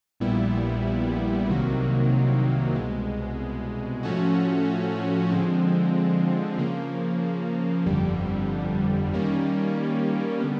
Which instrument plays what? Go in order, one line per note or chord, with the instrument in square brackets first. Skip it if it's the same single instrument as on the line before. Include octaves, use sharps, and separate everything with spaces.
[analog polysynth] A#1 A#2 G3 B3 E4
C2 C3 D#3 F#3 A#3
C2 B2 G#3
A2 F3 A3 C#4 F#4
D3 F3 G#3 C4
C#3 F3 A#3
G1 F2 D3 G3
D#3 G3 A#3 C#4
D3 G3 B3